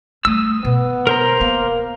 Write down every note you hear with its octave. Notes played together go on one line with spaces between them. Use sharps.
G3 A3 D#6 E6
B2 B3
A#4 C5 A#5
A#3 B3